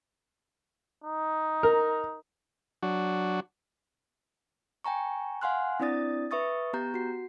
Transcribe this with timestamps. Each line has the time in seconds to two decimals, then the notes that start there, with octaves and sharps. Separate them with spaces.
1.04 D#4
1.63 A#4
2.83 F#3 D4 F#4
4.84 G5 G#5 A#5 C#6
5.41 F5 F#5 G#5 C6 F6 F#6
5.80 C4 D4 E4 D5 D#6 A6
6.31 B4 E5 C#6 D#6 A6
6.73 B3 G4 A#5 G6
6.94 F#4 C7